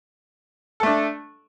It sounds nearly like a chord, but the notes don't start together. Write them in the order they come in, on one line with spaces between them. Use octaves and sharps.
A4 A3 D4